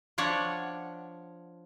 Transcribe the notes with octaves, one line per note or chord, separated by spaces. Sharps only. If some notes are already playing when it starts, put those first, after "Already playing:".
F3 D4 C#5 F#5